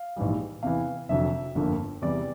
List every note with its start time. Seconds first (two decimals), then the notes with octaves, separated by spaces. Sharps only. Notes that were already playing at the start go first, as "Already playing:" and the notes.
Already playing: F5
0.16 A#1 G#2 E3 G3
0.63 E2 C3 E3 F5
1.09 F1 F2 D3 F#3 E5
1.55 G1 F2 D3 F3 A#3
2.02 E2 C3 E3 G3 D5